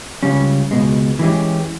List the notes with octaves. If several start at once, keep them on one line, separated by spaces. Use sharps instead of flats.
C#2 C#3 G3 C#4
C#2 B2 G#3
E3 G#3 C#4 G4